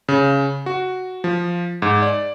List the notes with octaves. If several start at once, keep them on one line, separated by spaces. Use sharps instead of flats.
C#3
F#4
F3
G#2
D5